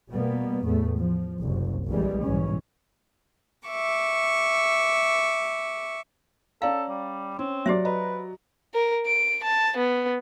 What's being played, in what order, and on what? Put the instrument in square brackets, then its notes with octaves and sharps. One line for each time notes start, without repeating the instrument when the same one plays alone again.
[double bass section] B2 G3 A#3 B3
E2 A2 A3 B3
F3
F#1 C2 F#2
A#1 C3 E3 G3 G#3
B1 G#2 E3 C#4
[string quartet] E5 C#6 D6
[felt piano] C#4 D5 A#5 [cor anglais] A4 [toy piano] F5
[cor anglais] G3
[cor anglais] C4 [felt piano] C#4
[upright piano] F#3 D5 [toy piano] G4 C5 E5
[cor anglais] B4 [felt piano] D#5 A#5
[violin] A#4
D7
A5
B3